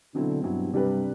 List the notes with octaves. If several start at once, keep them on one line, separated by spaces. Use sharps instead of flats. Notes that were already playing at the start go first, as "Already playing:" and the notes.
B2 D3 F#3 C4 E4
G2 B2 F#3 C4 E4
G2 C3 G3 D4 G4 B4